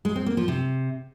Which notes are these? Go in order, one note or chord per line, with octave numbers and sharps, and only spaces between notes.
G#3
C4
A#3
F3
C3